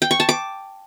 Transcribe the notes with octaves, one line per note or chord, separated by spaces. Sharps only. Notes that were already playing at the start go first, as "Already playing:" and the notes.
G5
C#6
A5
D6